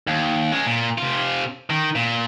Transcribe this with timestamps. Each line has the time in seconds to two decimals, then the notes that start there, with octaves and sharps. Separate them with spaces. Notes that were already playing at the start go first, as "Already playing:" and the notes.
0.07 D#2
0.52 G#3 C#4
0.66 A#2
0.98 C3 F4
1.70 D#3
1.95 A#2